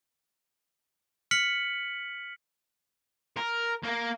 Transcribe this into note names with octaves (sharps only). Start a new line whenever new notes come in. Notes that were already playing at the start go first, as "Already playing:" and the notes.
F6 B6 C#7 F#7
A#4
A#3 A#4